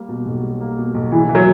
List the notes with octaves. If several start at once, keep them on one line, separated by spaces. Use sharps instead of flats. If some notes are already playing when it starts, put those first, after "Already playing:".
Already playing: G3 A#3
B2
B1
G3
A#3
B2
B1
C#3 E3
E3
F#3